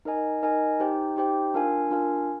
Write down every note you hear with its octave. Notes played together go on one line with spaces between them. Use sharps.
D#4 A#4 D#5 G#5
D#4 A#4 D#5 G#5
D#4 G4 C5 G5
D#4 G4 C5 G5
D4 F4 A#4 F5 G#5
D4 F4 A#4 F5 G#5